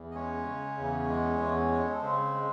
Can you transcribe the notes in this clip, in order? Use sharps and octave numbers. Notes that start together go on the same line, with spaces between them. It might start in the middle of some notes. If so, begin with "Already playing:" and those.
Already playing: E2
D#5
G#3 C#4 C#5
C#3
E2
G#3
E2
G#3
A4
C#3 C4 C5
G#3